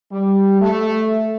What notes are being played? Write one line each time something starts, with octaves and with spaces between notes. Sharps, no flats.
G3
A3